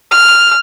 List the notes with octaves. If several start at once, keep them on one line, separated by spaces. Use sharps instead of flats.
F6